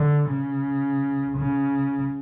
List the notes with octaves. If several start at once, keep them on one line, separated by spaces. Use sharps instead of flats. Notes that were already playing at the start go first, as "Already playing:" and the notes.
Already playing: D3
C#3
C#3